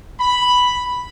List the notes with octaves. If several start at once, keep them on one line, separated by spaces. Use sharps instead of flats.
B5